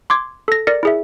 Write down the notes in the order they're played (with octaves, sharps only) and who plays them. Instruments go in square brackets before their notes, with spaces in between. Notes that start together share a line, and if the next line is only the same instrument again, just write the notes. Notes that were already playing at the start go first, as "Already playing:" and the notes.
[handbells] C6 D6 G#6
A4 A#6
A#4 D5 A#6 C#7
E4 G#4 E5